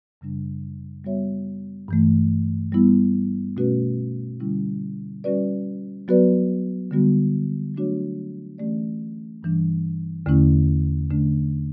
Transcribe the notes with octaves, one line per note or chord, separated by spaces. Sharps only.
F#2 C#3 G3 D4
G3 B3 F#4 C#5 E5
G2 E3 A3
G3 B3 E4
B2 A3 C#4 F#4 B4
D3 G3 C#4 E4
G3 C#4 F#4 B4 D5
F#3 B3 F#4 B4 D5
D3 G3 B3 F#4
F#3 A3 D4 F#4 C#5
E3 A3 C#4 G4 D5
G2 E3 G3 D4
E2 D3 A3 C#4 E4
D3 A3 D4